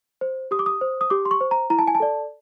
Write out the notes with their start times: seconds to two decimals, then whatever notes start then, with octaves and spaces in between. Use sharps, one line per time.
0.21 C5
0.51 G4 D#6
0.59 D6
0.66 D#6
0.81 C5
1.01 D#6
1.10 G4 D6
1.25 C6
1.31 C#6
1.41 C5
1.51 A#5
1.70 E4 A#5
1.79 A5
1.87 G#5
1.95 A5
2.00 A4 D5